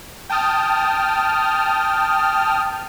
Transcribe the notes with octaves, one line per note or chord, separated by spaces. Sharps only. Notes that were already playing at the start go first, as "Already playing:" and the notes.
G5 A5 D#6 F6